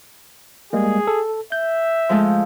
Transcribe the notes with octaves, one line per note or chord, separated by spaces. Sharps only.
G3 G#3 A#3 G#4
A4
E5 G6
F3 G#3 A3